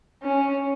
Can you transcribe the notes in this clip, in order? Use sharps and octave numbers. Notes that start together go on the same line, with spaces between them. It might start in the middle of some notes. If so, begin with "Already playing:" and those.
C#4